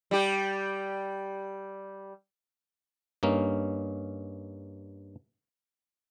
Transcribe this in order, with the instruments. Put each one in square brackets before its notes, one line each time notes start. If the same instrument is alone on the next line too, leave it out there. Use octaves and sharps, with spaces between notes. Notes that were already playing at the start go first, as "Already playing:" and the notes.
[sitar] G3 G4
[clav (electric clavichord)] G2 A#3 C#4 D#4